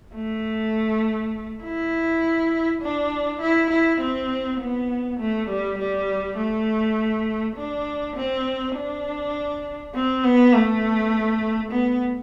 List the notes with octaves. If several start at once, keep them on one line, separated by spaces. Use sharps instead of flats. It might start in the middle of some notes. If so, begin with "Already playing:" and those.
A3
E4
D4
E4
E4
C4
B3
A3
G3
G3
A3
D4
C4
D4
C4
B3
A3
B3